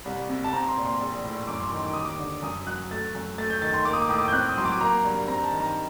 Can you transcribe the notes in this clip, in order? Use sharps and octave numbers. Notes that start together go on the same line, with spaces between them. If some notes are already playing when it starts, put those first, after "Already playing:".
C2
C3
A5
C4 A#5
C6
A#2
C6
A#1
A2
F#2 D6
C6
D#3 C6
D6
D#2 D#6
D6
D3
F#2 D#6
F#3 F#6
A3 A6
F#2
A3 A6
G6
D#3 A6
C6
A#3 D6
D#6
D6
A2 D#6
D6
G6
C4 F#6
D#6
F#3 C6
D6
A#3 A#5
G2
C4 A#5
A5
D#3
A#5